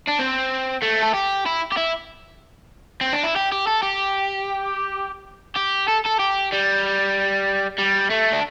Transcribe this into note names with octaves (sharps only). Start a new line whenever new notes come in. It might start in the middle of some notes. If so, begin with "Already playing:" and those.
D4
C4
A3
A4
G4
E4
G4
E4
C4
D4
E4
G4
G4
A4
G4
G4
A4
A4
G4
G3
G3
A3
D4